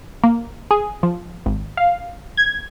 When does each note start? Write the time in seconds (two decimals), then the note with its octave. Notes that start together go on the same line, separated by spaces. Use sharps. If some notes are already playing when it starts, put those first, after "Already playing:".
0.24 A#3
0.71 G#4
1.03 F3
1.46 G#1
1.77 F5
2.37 G#6